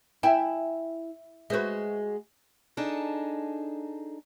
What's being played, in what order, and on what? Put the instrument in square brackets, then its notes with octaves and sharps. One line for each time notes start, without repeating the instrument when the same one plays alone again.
[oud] E4 [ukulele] G5 G#5
[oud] G#3 F#4 [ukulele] B4 C5 E5
[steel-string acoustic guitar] D4 D#4 G#4 A4